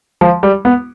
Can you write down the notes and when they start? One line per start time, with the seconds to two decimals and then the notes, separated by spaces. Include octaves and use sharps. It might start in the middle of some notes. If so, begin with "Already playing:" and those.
0.21 F3
0.43 G3
0.65 B3